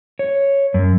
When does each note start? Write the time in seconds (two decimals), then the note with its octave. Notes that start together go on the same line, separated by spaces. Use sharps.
0.19 C#5
0.74 F#2